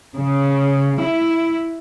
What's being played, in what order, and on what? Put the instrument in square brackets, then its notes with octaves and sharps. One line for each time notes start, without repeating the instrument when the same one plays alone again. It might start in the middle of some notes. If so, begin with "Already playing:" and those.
[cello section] C#3
E4